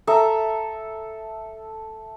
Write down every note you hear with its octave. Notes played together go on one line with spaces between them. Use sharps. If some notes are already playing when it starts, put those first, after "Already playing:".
A4 E5 A#5